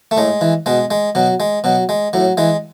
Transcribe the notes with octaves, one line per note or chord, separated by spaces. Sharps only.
A3
A2 G#3
E3
B2 G#3
G#3
B2 F#3
G#3
B2 F#3
G#3
A2 F#3
E3 G#3